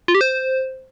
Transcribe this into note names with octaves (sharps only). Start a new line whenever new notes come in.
F4
G4
C5